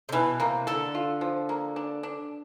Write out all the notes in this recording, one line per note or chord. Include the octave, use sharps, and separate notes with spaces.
C3
B2 E3
C3 A#3
D3 A4
F4
F3
A#3
D4
D4